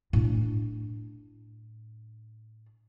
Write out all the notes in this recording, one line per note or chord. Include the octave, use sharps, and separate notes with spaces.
A2 D4